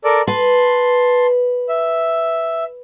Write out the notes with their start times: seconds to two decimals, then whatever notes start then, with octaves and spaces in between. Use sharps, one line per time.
0.04 A4 A#4 D5
0.27 B4 A5 C6
1.69 E5